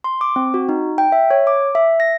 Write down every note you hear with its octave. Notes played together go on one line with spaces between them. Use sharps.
C6
D6
C4
F#4
D#4
G5
E5
C#5
D6
E5
A#6